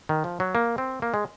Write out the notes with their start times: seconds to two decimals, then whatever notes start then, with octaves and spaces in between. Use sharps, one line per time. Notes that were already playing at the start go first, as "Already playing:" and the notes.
0.09 D#3
0.24 F3
0.40 F#3
0.55 A#3
0.78 C4
1.02 A#3
1.14 G#3